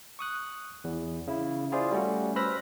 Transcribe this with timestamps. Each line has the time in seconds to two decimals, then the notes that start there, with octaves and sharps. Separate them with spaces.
0.19 C#6 D#6 F#6
0.84 E2
1.27 C#3 E4
1.72 E4 F4 G#4 C5 D5
1.91 G3 A3 C#4 F#4
2.36 B4 C5 B5 E6 F6 A#6